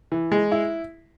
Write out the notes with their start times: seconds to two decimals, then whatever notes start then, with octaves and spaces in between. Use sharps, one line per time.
0.12 E3
0.32 G#3
0.52 E4